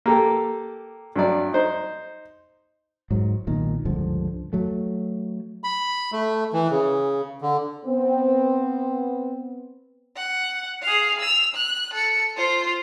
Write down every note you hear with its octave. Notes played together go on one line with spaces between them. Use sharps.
A#3 G4 A4
G2 F#3 D5
D#4 C5
G#2 F#3
B1 A#2 D#3
C#2 G2 D3 F3
F#3 A3
B5
A3
E3
C#3
D3
B3 C4
F#5
G#4 F5
E6 F7
F#6
A4 C#7
F4 C5